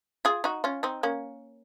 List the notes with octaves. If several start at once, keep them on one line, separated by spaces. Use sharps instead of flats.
F4 G#4
D#4 F#4
C#4 F4
C4 D#4
A#3 C#4